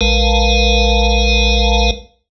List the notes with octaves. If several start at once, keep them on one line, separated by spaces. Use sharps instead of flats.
A#1 G#3 A#4 B4 F5 A5